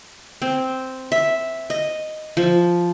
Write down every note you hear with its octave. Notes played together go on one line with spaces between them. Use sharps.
C4
E5
D#5
F3